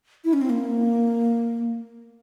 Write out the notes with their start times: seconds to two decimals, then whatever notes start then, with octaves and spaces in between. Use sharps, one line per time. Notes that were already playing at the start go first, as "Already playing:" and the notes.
0.25 E4
0.33 C#4
0.41 C4
0.50 A#3